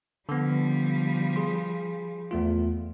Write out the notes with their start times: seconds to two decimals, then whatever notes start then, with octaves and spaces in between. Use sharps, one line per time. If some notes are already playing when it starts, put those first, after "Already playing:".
0.29 D3 F3 G3 B3
1.36 G#4 C6
2.31 E2 A3 F4